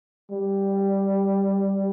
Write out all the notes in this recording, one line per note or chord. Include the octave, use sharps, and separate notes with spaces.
G3